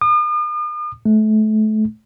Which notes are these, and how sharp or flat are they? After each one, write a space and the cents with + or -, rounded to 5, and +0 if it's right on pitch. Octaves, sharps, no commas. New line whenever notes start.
D#6 -45
A3 -30